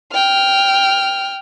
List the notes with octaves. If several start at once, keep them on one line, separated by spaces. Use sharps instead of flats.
G5 F6